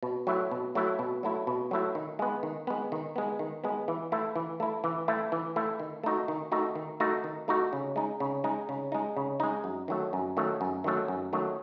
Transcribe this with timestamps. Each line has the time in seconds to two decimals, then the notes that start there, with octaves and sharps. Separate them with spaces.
0.03 B2
0.27 F#3 A3 E4
0.51 B2
0.75 F#3 A3 E4
0.99 B2
1.23 F#3 A3 E4
1.47 B2
1.71 F#3 A3 E4
1.95 D#3
2.19 G#3 B3
2.43 D#3
2.67 G#3 B3
2.92 D#3
3.16 G#3 B3
3.39 D#3
3.64 G#3 B3
3.88 E3
4.12 A3 E4
4.36 E3
4.60 A3 E4
4.84 E3
5.08 A3 E4
5.32 E3
5.56 A3 E4
5.80 D#3
6.04 A3 D#4 F#4
6.28 D#3
6.52 A3 D#4 F#4
6.75 D#3
7.00 A3 D#4 F#4
7.24 D#3
7.48 A3 D#4 F#4
7.73 C#3
7.96 G#3 D#4
8.20 C#3
8.44 G#3 D#4
8.69 C#3
8.92 G#3 D#4
9.16 C#3
9.40 G#3 D#4
9.64 F#2
9.88 D#3 F#3 A3
10.13 F#2
10.37 D#3 F#3 A3
10.61 F#2
10.84 D#3 F#3 A3
11.08 F#2
11.33 D#3 F#3 A3